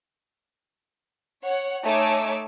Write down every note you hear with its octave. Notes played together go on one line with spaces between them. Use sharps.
C#5 F#5
A3 D#4 C#5 G#5 D6 E6